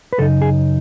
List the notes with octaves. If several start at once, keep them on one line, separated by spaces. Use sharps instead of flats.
B4
F#2 C#3 D#4 A4
G#4